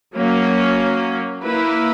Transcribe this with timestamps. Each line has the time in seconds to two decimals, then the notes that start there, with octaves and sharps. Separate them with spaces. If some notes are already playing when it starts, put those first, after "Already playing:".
0.15 F#3 A#3 C#4
1.42 A#3 E4 B4